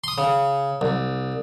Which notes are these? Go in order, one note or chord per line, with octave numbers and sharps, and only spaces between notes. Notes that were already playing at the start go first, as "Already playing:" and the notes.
C6 D#6
C#3
C2